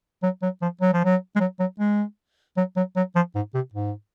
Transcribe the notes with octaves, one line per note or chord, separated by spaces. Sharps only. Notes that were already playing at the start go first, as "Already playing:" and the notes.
F#3
F#3
F3
F#3
F3
F#3
G#3
F#3
F#3
G#3
F#3
F#3
F#3
F3
G#2
C3
G#2